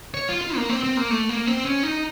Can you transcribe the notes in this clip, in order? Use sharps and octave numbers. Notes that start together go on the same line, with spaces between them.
C#5
F4
F4
A#3
C4
C4
A#3
A3
A#3
C4
C#4
D#4